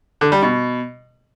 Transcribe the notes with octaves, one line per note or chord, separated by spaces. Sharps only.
D3
G3
B2